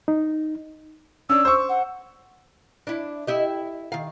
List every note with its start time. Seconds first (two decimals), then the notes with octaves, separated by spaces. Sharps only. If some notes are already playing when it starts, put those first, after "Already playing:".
0.08 D#4
1.30 C#4 D4 E6
1.45 C5 C#6
1.69 F#5
2.87 D4 E4
3.27 E4 G4 D#5
3.92 D#3 F5